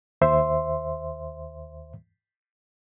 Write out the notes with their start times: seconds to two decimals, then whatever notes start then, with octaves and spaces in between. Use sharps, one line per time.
0.21 D#2 C5 E5 C6